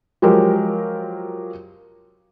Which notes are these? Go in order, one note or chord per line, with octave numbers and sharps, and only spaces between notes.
F3 F#3 G#3 G4 A#4